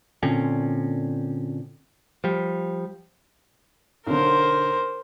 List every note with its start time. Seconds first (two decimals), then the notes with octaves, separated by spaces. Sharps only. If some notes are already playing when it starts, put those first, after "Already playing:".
0.23 A#2 D3 C4 C#4
2.24 F3 G3
4.07 B1 D3 A#4 C5